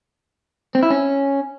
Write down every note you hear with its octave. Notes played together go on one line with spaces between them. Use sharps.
C4
E4
C#4